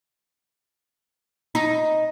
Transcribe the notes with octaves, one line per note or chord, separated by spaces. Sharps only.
D#4